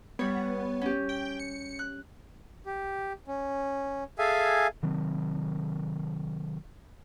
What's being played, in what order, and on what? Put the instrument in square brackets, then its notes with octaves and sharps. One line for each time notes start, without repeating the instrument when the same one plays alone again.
[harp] G3 C#5 [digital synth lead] B3
[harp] C#4 G4
[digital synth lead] G5
C#7
[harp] F#6
[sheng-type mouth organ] G4
C#4
G#4 A4 E5 F5 G#5
[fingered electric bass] C3 D#3 F#3 C4